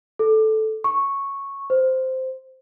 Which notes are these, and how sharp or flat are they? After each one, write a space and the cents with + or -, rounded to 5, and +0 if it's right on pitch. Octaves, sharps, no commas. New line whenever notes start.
A4 -10
C#6 -5
C5 -5